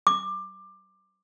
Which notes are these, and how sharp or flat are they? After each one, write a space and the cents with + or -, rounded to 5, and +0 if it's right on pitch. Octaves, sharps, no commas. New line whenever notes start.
D6 +20